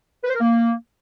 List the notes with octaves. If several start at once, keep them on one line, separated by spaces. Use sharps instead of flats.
B4
C5
A#4
A#3